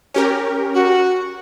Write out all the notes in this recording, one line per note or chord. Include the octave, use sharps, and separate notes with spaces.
C#4 G4 A#4
F#4